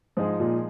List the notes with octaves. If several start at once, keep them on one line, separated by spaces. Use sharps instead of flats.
G#2 F3 G#3 D#4 G#4
A#2